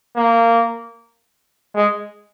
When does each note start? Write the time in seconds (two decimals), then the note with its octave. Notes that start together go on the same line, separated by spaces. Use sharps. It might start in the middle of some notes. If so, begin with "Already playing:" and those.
0.16 A#3
1.75 G#3